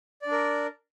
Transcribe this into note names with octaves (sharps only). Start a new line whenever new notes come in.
D4 A#4 D5